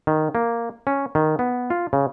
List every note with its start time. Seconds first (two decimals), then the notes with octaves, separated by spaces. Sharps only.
0.07 D#3
0.35 A#3
0.87 C#4
1.15 D#3
1.39 B3
1.70 F4
1.93 C#3